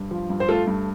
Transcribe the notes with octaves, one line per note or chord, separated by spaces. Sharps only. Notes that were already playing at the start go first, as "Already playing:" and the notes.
Already playing: G2
F3
G2
C5
A3 F4 A4
G2